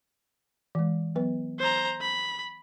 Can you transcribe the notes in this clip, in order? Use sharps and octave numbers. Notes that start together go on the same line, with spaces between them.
E3 G#3
F#3 B3 B4
C5 A#5
B5